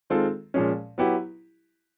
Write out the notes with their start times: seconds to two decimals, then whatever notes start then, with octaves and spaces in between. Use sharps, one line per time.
0.10 D#3 G#3 C4 F4 A4
0.54 A#2 F3 G#3 C#4
0.98 F#3 B3 E4 G4